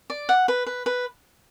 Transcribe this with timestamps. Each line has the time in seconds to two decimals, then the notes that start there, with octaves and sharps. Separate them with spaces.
0.10 D5
0.29 F#5
0.48 B4
0.67 B4
0.86 B4